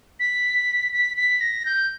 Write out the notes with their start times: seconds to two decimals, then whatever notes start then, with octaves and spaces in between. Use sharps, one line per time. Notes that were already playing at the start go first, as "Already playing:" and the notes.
0.20 B6
0.92 B6
1.17 B6
1.41 A#6
1.66 G6